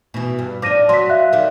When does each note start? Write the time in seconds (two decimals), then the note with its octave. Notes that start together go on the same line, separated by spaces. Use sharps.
0.14 B2 E3
0.39 G2
0.62 F3 D4 D6 A#6 D#7
0.89 F#3 C6 B6
1.10 E5 F5 F#6
1.33 D#3 G3